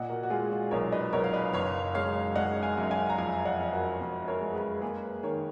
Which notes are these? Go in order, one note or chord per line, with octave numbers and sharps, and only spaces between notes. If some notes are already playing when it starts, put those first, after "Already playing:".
Already playing: A#2 D#5 F#5
F#4 A#4
F#4
G#3 F4 G#4
F#4
B1 A#4 C#5
B4 D#5
B1 A#4 C#5
F5
B4 D#5
F#1 C#5 F5
G#3 C#5 F5
G#3 D#5 F#5
F5 G#5
F#2
F5 G#5
A#5
F2 F5 G#5
D#5 F#5
F2
F#4 A#4
F2
A#4 C#5
G#3
G#4 B4
A#3 G#4 B4
D#3 A#4 C#5